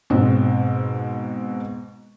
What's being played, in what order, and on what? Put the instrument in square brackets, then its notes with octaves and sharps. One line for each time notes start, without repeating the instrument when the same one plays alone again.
[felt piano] G#2 B2 C4